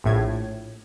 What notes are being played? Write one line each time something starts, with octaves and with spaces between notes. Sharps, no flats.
A#1 A2 G#6